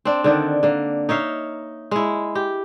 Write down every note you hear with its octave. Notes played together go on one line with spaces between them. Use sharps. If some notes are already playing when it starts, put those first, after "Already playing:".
C4 D4
D3 D#3 D4
D3 A#3
D#4 C#5 E5 F5
G#3 E4
G4